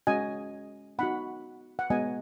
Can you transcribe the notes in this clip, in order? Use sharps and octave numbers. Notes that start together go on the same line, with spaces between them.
G#3 C#4 F#4 D#5 G#5
B3 D#4 F#4 F#5 B5
F#5
G#3 B3 F#4 D#5 G#5